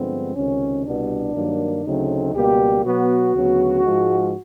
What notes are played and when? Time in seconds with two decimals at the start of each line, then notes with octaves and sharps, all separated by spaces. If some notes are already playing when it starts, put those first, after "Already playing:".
Already playing: G2 D3 F3 G#3 B3 C4
0.35 C#2 C3 D#3 C#4
0.86 C2 B2 G3 B3 D4
1.35 G2 D#3 F#3 A#3
1.85 D2 C#3 F#3 A3 C4 D#4
2.34 C#2 B2 G3 A#3 G4
2.85 B2 F#3 B3 F#4
3.34 D2 C#3 F#3 B3
3.84 G#2 F3 G#3